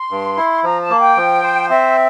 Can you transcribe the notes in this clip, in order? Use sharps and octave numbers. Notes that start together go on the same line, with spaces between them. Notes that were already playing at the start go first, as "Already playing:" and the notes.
Already playing: C6
G2
E4
F3 A#5
A5
A#3
G5
F3
C5
C4 E5